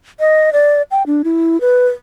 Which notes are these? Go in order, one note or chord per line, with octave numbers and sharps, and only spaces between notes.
D#5
D5
G5
D4
E4
B4